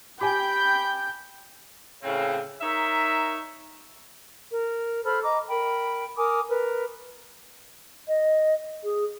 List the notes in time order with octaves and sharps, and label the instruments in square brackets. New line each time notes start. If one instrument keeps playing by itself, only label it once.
[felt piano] G4 G#5 [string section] G5 G6 [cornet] B5
[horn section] A2 C#3 C4
D#4 A#4 C#5 E5
[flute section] A#4
A4 C5 B5 F6
D#5 A#5 D6
A#4 G5 B5
A#4 G#5 D6 D#6
A#4 B4
[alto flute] D#5
G#4